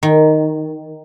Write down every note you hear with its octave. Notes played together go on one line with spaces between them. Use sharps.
D#3